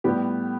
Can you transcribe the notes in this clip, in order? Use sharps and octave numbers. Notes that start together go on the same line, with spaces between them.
A2 G3 B3 G4